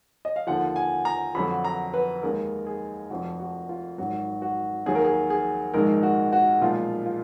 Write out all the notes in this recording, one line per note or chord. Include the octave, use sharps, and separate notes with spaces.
D#5
F5
D#2 D3 F3 F#5
G#5
A#5
F2 D3 F#3 B5
A#5
B4
D#2 D#3 G#3 A#4
G#4
F1 F2 F3 F#4
F#4
F4
G#1 G#2 F#3 F#4
F#4
D#2 D#3 F#3 G#4
A#4
G#4
G#4
A#1 G#2 D#3 G#3 A#4
F#4
F#4
B1 A#2 F3 G#3 F4
F4